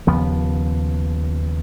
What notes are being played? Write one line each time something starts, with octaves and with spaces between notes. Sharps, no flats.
D#2 C#3 F3 B3